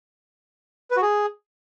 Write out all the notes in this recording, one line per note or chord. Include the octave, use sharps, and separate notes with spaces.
B4
F#4
G#4